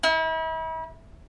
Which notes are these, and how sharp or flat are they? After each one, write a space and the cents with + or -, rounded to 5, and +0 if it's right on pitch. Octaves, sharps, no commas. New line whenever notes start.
E4 -40